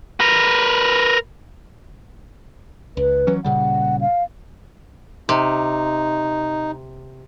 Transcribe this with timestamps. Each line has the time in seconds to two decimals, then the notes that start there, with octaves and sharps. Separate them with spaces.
0.20 A#4 B4
2.97 C#2 B4
3.27 E3 F#3 C#4
3.45 A#2 C#3 G3 F#5
4.01 F5
5.29 C3 D#4